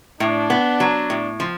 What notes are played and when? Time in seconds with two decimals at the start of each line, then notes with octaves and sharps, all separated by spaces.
0.20 A2 D4
0.50 B3
0.80 F#3
1.10 A2
1.40 F3